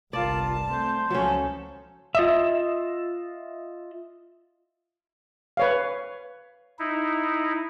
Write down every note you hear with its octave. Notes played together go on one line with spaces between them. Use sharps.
G1 C2 F4 A#4 D5 A5
A3 C4 C6 G6
C#2 F3 F#3 C#4 A4
F4 D#5 E5
B4 C#5 F5
D#4 E4